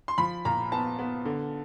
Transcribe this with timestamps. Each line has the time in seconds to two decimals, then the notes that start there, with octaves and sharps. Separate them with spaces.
0.08 C6
0.18 F3 B5
0.45 A#2 A#5
0.72 B3 A5
0.99 B3
1.25 D3